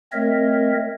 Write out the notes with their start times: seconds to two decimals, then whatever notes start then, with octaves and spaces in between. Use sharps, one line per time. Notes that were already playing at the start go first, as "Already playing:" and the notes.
0.13 A3 C4 A#4 C#5 D#5 E5